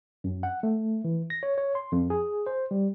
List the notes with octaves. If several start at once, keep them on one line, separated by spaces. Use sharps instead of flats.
F#2
F#5
A3
E3
A#6
C#5
C#5
C6
F2
G#4
C5
G3